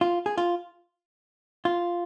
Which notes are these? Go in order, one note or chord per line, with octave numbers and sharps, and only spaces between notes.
F4
G#4
F4
F4